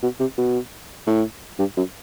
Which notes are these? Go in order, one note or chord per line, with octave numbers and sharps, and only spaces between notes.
B2
C3
B2
A2
G2
F#2